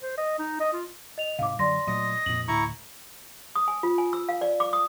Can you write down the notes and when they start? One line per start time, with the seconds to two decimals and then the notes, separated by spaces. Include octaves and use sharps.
0.03 C5
0.18 D#5
0.39 D#4
0.60 D#5
0.73 F4
1.18 D#5 F7
1.39 G#2 C3 F5 D6
1.59 F#2 D3 F#3 D5 C6 A#6
1.87 A#2 F#3 A3 D#5
2.26 F2 A#2 F#7
2.48 D2 A2 E4 A#5 C#6
3.56 D#6
3.68 G#5
3.83 F4
3.98 G#5
4.13 E6
4.29 F5
4.41 D5
4.60 D6
4.73 D#6